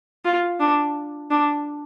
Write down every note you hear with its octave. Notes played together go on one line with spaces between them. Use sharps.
F4
D4
D4